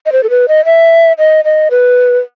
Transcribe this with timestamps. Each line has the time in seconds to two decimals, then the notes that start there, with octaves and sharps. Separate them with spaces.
0.06 D#5
0.12 C5
0.23 A4
0.30 B4
0.48 D#5
0.65 E5
1.19 D#5
1.45 D#5
1.71 B4